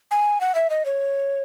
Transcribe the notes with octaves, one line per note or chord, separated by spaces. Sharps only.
G#5
F#5
E5
D#5
C#5